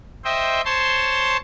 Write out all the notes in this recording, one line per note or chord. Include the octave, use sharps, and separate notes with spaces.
C5 D#5 E5 G5
C5 C#5 A5 C6